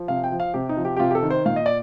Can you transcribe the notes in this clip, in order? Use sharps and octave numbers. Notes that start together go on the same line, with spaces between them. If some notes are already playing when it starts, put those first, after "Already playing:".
Already playing: F3
C3 F5
G5
F3
F5
C3 G4
D#4
F3
G4
G4
C3 F4
G4
A4
D#3
C5
A#2 F5
D#5
D5